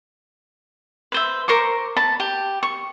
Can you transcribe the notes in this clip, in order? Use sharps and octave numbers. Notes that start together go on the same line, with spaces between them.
B4 C5 E5
A#4 C5 C#6 D6
A5 B5
G4
C#6